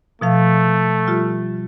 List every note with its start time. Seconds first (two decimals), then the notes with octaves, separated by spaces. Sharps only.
0.21 B2 F3 A3 F5
1.07 G3 F4 G4